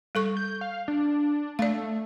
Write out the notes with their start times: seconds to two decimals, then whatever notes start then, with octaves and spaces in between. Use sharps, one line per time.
0.15 G3 A4 C#6
0.37 G6
0.61 F5
0.88 D4
1.59 A3 D5 F5